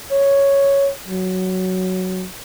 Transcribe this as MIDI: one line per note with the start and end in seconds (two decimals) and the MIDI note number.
0.12 0.90 73
1.09 2.26 54